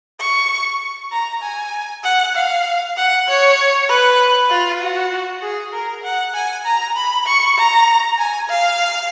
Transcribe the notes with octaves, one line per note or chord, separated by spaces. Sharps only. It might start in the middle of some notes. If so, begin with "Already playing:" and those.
C#6
A#5
G#5
F#5
F5
F#5
C#5
B4
F4
F#4
G#4
A#4
F#5
G#5
A#5
B5
C#6
A#5
G#5
F5